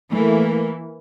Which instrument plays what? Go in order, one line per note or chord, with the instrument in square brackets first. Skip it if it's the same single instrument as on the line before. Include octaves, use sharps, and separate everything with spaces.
[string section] E3 A#3 [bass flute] A3